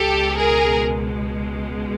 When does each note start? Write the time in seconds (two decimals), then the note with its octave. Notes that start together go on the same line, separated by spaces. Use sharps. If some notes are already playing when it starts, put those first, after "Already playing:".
Already playing: C#2 B2 G#3 G4 A4
0.37 G#4 A#4